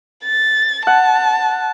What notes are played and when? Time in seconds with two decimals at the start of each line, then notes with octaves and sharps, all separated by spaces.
0.25 A6
0.87 F#5 A5